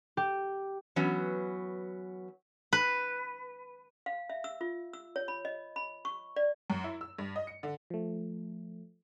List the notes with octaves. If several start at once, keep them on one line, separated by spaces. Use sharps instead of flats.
G4
E3 F#3 B3 C#4
B4
F5
E5
E6
F4
E6
C#5
B5
D#5
B5
C#6
D5
F#2
E4
E6
G2
D#5
C#7
D3
F3 A3